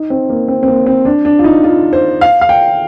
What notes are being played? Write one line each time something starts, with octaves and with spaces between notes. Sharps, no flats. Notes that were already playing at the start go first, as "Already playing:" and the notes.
Already playing: D#4
C4
A#3
C4
C4
A#3
C4
D4
D4
F4
D#4
F4
C5
F5
F5
G5